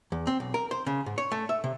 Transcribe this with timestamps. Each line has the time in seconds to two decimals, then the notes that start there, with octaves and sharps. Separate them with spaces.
0.12 E2
0.27 C4
0.40 B1
0.54 A#4
0.71 C5
0.86 C#3
1.06 G#2
1.18 C#5
1.32 A3
1.49 E5
1.64 C3